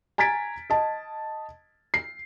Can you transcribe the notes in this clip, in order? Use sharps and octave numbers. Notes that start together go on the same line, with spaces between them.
G#5 A#5 G#6 A6 B6 D7
D#5 A5
C7